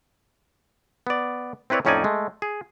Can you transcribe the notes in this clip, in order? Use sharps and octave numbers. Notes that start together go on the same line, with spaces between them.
B3 D5
C4 E4 B4 C#5 D5
F2 A2 C#4 D#4 D5 G#5
G#3 A3
G#4